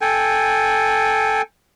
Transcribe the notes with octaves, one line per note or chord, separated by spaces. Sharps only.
A4 G5 G#5